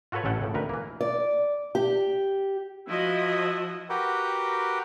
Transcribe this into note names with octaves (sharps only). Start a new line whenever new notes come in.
F4 F#4 A4 B4 C#5
A1 C#4 A4 F#5 G5
C#2 A2
D2 A#4 B4
E3 A#3
D5
G4
F3 E4 F#4 D#5
F#4 G4 A#4 B4 F#5 G5